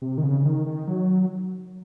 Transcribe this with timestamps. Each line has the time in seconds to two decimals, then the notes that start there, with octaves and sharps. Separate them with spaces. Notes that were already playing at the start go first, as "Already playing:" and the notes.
0.02 C3
0.18 D#3
0.24 C#3
0.45 D#3
0.66 D#3
0.87 F#3